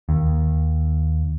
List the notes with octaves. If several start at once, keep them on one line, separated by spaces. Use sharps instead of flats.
D#2